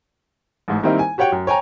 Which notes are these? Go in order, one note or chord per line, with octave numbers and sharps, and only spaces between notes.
A1 G#2
D#3 G3 A#3 C4 D#4 E4
G#5
F#4 G4 C#5 F#5 G5
F#2
C#5 G5 G#5 A#5